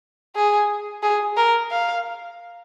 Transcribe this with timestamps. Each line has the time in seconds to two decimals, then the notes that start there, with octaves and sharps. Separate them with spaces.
0.36 G#4
1.03 G#4
1.37 A#4
1.71 F5